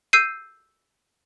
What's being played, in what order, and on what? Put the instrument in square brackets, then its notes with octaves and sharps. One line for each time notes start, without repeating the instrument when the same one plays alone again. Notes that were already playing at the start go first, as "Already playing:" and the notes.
[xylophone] E6 G6 C7 D#7